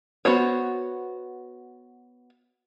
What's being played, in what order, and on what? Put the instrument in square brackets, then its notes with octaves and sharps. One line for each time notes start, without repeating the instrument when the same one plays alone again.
[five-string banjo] B3 F#4 C5 C#5